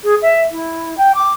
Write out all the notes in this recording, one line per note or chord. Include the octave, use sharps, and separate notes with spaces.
G#4
E5
E4
G5
D6